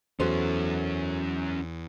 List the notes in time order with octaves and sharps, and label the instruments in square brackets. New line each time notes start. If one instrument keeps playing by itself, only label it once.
[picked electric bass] E2 [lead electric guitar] F#3 C#4 [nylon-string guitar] F#4 A4 C5